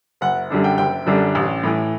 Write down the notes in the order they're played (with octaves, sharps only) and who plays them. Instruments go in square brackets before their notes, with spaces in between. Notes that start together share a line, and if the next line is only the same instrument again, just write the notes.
[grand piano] F#1 F#5
F#2 D3 G3 D4
G5
F#1 G5
F#2 D3 G3 D4
A1
A2 E3